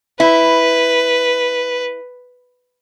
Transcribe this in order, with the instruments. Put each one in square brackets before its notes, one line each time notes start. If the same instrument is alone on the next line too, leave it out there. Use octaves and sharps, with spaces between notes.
[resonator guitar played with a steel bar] E4 [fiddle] B4